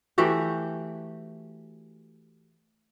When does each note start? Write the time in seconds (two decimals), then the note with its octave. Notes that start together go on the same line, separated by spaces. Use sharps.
0.18 E3 A3 F#4 G4